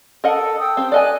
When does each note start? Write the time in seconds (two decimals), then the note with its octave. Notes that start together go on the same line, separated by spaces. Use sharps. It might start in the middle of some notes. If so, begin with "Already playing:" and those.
0.24 A4 A#4 D#5 F#5
0.58 G5 D#6 E6
0.77 C4 G4
0.92 A4 D5 D#5 G#5 F#6